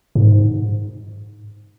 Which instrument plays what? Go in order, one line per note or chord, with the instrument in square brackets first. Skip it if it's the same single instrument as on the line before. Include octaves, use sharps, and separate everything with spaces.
[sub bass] G#2